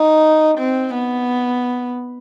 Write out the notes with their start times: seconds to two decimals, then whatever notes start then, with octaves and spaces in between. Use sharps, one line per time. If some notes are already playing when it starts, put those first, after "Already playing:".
Already playing: D#4
0.58 C4
0.94 B3